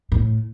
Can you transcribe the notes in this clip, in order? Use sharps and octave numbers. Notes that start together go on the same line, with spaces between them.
A2